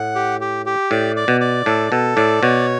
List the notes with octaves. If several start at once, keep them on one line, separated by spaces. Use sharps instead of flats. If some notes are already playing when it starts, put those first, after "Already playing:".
Already playing: A2 F#5
G4
G4
G4
A2 D5
D5
B2
D5
A2 A4
B2 A4
A2 D5
B2 C#5